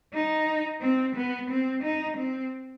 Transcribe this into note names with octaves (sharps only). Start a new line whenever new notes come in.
D#4
C4
B3
C4
D#4
C4